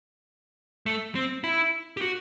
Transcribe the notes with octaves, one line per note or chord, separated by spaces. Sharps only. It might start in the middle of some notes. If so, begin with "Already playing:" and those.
A3
C4
E4
G4
F#4